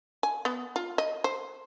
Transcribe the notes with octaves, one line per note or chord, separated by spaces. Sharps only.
G#5
B3
F4
D#5
C5